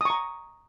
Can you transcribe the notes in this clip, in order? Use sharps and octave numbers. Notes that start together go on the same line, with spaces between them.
A#5 C#6 D#6